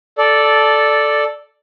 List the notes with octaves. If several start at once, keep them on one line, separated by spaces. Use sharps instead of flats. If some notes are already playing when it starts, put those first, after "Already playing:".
A4 D5